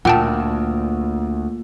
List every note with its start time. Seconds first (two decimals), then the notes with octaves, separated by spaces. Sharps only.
0.05 D2 A#2 F#5 G5 A5